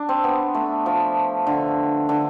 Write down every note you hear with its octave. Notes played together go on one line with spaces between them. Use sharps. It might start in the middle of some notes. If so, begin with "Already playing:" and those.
Already playing: D4
C4
B3
A3
F3
D3
D3